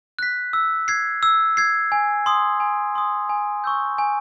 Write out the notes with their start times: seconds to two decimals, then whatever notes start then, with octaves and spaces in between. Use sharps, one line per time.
0.19 F#6 B6
0.53 E6
0.88 G#6 C7
1.23 E6
1.57 G#6 C7
1.92 G#5
2.26 C6 D#6
2.60 G#5
2.95 C6 D#6
3.29 G#5
3.64 C#6 E6 G6
3.98 G#5